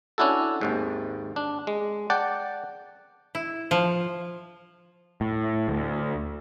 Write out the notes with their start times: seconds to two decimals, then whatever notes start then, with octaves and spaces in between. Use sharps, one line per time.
0.18 C#4 D4 E4 F#4 A4
0.61 G#1 D#2 G#2
1.36 D4
1.67 G#3
2.10 D5 F#5 G5 A5
3.35 E4
3.71 F3
5.21 A2
5.68 D2